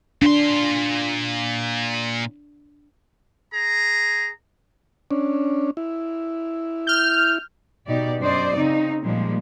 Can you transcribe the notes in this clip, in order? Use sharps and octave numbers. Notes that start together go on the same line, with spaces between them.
A#2 D4 C6
G#4 A#5
C#4 D4
E4
F6 G6
B2 D#4 G4 D5
F#2 D4 C5 D5 D#5
C#3 C4 D#4
A#2 F3 G3 G#3 A#3